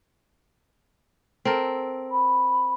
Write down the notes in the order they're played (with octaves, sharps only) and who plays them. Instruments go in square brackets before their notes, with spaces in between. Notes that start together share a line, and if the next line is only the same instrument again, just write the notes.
[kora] C4 A4 A#4
[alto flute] B5